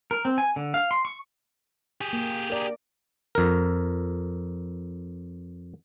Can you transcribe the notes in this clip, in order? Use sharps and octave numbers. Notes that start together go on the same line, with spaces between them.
A#4
C4
G#5
D3
F5
C6
C#6
G4 G#4
A#3
A#4 D5
F2 A#4